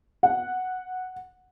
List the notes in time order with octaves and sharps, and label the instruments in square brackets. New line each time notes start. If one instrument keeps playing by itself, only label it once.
[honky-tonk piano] F#5